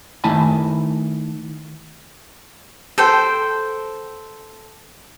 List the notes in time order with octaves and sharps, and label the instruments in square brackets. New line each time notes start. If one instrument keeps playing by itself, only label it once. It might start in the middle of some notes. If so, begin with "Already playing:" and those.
[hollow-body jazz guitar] D#3 A3 E4 G#5 A5 B5
[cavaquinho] A4 C5 G5